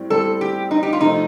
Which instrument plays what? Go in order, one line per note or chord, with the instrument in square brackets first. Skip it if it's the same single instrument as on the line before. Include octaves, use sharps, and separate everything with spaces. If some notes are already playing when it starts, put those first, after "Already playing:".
Already playing: [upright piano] A2 G3 C4
[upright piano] A2 G3 C4 [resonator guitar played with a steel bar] A4
[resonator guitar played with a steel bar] G4
D#4
G4
F4
[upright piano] C3 F3 A3 C4 [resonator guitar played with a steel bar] D#4